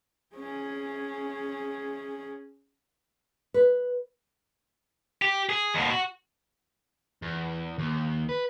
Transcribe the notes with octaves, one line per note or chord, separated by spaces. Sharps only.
C#4 G#4
B4
G4
G#4
D#2 B2
F#4
E2
D#2
B4